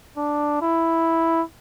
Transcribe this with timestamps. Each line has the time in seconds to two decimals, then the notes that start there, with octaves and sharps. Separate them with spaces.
0.17 D4
0.62 E4